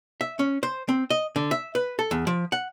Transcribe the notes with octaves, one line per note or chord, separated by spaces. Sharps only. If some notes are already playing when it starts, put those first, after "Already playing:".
E5
C#4
C5
C4
D#5
D3
E5
B4
A4
E2
F3
F#5